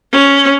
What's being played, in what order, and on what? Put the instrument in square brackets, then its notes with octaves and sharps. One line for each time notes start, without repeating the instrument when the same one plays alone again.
[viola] C#4